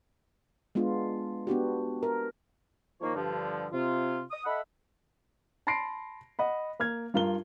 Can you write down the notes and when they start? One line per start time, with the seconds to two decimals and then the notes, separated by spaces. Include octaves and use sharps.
0.75 G#3 B3 D4 F4
1.47 B3 D4 F#4 G4
2.03 A#4
3.01 D#3 F3 A#3 C#5
3.15 G2 D3 F3
3.72 C3 F4
4.31 D#6
4.45 A4 D#5 E5 F#5 B5
5.67 A5 B5 C6 A#6 C7 D7
6.39 D#5 F#5 B5
6.80 A#3 F6 G#6
7.14 G2 F4 A#4 G7